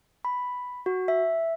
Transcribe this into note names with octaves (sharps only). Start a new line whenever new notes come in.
B5
F#4
E5